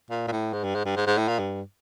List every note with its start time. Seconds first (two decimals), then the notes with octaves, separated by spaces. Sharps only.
0.10 A#2
0.28 A#2
0.32 A2
0.53 G#2
0.64 G2
0.75 G#2
0.85 G2
0.96 G#2
1.07 G#2
1.18 A2
1.28 A#2
1.39 G2